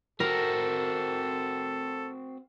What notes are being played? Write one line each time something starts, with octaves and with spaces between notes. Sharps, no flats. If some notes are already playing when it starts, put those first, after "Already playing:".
C4 F#4 A4 A#4